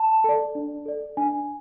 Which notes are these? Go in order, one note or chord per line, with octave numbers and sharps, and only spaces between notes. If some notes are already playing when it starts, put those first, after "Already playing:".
Already playing: A5
A4 D5
D4
A4 D5
D4 G#5